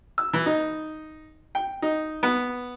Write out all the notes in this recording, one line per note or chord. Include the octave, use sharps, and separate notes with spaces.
E6
E3
D#4
G5
D#4
B3